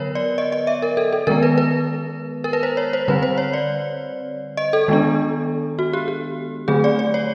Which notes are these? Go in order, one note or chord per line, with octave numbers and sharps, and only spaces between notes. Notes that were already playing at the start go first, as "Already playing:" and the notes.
Already playing: D3 F#3 B3 A#4 B4 C#5
D5
D#5
D#5
E5
A#4
A4
A4
D#3 G#3 B3 A#4
B4
B4
A#4
B4
C5
C#5
C5
D3 G3 C4 B4
C5
C#5
D5
D#5
A4
D#3 G#3 B3 D4
F#4
G4
G4
D3 F#3 A3 C4 G#4
D5
D5
C#5